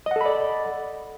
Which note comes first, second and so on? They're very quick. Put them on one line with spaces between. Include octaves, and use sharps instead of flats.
D#5 F#5 A4 B5 D5